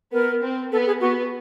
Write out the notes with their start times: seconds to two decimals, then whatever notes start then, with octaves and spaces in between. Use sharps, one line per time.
0.13 B3 A#4
0.42 C4
0.72 B3 A4
0.87 G#4
1.01 B3 F#4